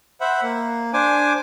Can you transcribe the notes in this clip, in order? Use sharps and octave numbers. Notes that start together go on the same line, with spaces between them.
C5 E5 F#5 B5
A#3
D4 C5 G#5 D6